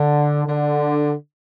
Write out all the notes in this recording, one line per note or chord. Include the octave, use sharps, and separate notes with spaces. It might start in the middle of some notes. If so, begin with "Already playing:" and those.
Already playing: D3
D3